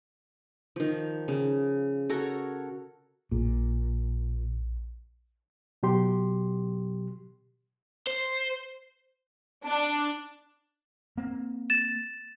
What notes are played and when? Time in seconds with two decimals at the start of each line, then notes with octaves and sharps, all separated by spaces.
0.76 D#3 F3
1.28 C#3
2.09 F#4 A4 A#4 C#5
3.32 A#1 A#2
5.83 B2 F#3 G4 C6
8.07 C5
9.62 D4
11.17 A#3 C4
11.70 A6 E7